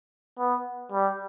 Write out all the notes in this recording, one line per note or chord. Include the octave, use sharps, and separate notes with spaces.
B3
G3